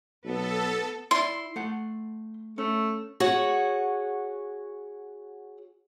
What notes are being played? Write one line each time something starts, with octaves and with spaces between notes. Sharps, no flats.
B1 B3 A4
E4 D5 C6
A3 F#5
A3 C#4
F#4 G#4 C#5 F#5